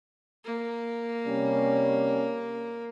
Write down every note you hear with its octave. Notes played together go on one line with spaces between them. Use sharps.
A#3
C3 G3 C#4